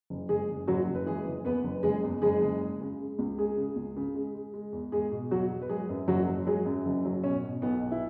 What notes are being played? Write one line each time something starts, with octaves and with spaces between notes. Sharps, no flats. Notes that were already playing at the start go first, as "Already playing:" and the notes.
F#1
F#1 G#3 G#4
F#1
F#1 F#3 F#4
F#1
B4
E3 G#3 G#4
F#1
E2 B3 B4
F#1
F#1 G#3 G#4
E2
F#1 G#3 G#4
F#1
G#3
C#3
G#3
C#2
G#3 G#4
C#3
C#2
C#3
G#3
G#3
G#3
E2
E2 G#3 G#4
B2
E2 F#3 F#4
E2
B4
F#3 G#3 G#4
F#2
F#1 F#3 F#4
F#3
F#3 G#3 G#4
F#2
F#1
F#3
B2 C#4
B2
B1 B3
B2
E4